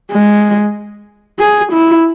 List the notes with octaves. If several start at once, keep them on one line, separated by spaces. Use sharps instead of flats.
G#3
G#4
E4